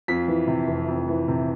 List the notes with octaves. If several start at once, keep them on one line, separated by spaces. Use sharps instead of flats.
F2 B6
E3
C3
F1
F2
E3
C3